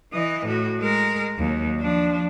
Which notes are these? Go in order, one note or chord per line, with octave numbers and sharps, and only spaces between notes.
E3 D#5
A2 F#4
G#3 A#4
D#2 F#3
F3 D4